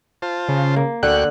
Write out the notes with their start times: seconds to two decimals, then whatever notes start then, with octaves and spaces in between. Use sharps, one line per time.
0.22 F4 C5 A5
0.48 C#3
0.76 A#3
1.03 D2 D3 F#4 G5 F#6